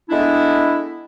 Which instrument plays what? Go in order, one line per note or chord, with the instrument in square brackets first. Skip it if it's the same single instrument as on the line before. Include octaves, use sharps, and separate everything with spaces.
[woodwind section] G#3 A3 B3 D4 E4